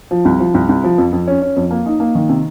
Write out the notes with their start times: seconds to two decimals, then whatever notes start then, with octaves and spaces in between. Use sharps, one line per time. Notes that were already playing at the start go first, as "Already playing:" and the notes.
0.11 F3
0.25 C2
0.40 F3
0.54 C2
0.69 C2
0.84 F3
0.98 F2
1.13 F2
1.27 C#4
1.42 C#4
1.56 F2
1.71 A#3
1.86 D#4
2.00 A#3
2.15 D#3
2.29 C3